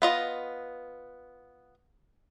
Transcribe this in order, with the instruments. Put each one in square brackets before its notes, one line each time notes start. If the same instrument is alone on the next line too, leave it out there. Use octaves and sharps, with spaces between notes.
[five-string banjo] B3 F4 D#5